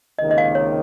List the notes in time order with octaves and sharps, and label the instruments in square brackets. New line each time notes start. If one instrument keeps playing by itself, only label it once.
[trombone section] C#2 C3 D#3 A#3 [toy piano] D#5
[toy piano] D#5
F5
C#5